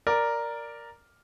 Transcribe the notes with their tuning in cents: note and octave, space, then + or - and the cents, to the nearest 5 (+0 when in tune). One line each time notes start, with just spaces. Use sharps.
A#4 +0 D5 +0